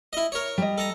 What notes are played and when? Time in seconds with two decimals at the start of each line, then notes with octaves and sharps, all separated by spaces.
0.13 E4 D#5
0.32 A#4 C#5
0.58 G3 D#5
0.78 A4 A#5